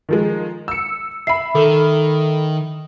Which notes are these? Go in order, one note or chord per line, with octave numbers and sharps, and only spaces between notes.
D#3 F3 G#3
E6 C#7
E5 B5 C7
D#3 A4